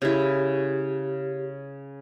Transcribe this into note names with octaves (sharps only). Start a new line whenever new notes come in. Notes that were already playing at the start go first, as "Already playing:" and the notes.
C#3 E4 G4